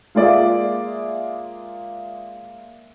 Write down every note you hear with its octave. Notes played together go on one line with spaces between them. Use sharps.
G#3 A#3 F4 G#4 D5 E5